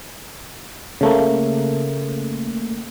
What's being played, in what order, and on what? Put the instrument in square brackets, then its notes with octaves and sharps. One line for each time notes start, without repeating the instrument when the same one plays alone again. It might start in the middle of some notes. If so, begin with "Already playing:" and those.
[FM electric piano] C#3 A3 A#3